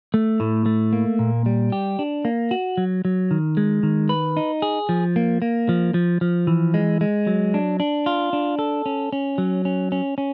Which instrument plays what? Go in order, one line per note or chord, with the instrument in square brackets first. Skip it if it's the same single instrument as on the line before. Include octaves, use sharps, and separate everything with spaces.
[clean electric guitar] A3
A2
A3
A#3
A#2
G3
G4
D4
A#3
F#4
F#3
F#3
D#3
G#3
D#3
B4
D#4
G#4
F3
A#3
A#3
F3
F3
F3
E3
G#3
G#3
F#3
D4
D4
F4
D4
A4
C#4
C#4
F#3
C#4
C#4
C#4